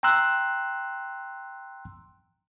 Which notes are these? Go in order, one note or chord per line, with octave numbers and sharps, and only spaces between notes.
G5 A#5 C6 E6 F#6